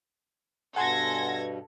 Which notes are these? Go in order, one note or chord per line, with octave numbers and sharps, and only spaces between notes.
G2 B2 A4 F#5 G#5 C6 G#6 A#6